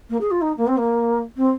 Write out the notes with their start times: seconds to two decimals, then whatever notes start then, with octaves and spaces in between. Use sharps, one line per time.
0.09 A#3
0.20 G#4
0.30 F4
0.41 D#4
0.57 A#3
0.67 C4
0.77 A#3
1.36 C4